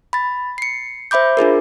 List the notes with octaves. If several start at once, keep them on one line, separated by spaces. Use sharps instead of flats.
B5 A6
C7 C#7
C5 E5 B5 D6 G6
D4 F4 G#4 A#4